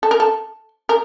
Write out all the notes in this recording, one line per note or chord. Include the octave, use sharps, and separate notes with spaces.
A4
A#4
A4
A#4